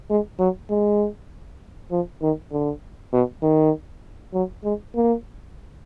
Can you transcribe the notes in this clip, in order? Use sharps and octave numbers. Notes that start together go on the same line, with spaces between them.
G#3
F#3
G#3
F3
D#3
D3
B2
D#3
F#3
G#3
A#3